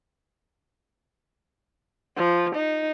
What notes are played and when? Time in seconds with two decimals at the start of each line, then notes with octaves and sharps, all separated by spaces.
2.17 F3
2.56 D#4